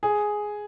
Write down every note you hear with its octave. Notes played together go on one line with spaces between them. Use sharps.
G#4